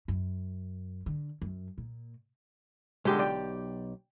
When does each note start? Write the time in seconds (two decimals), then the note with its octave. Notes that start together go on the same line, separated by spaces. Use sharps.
0.08 F#2
1.06 D3
1.42 F#2
1.78 A#2
3.05 B1 D3 G#3 G4
3.19 D5 G5